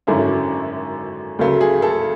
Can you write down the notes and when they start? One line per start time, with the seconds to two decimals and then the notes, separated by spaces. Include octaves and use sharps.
0.07 G#1 F#2 D3 A3 C#4 E4
1.39 D2 C#3 F#3 A3
1.61 G#4
1.82 A4